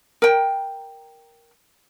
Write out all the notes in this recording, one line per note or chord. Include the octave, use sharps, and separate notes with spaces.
A#4 G5